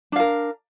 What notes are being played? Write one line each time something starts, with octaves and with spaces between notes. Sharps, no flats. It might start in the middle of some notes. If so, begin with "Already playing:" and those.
D4 A#4 F5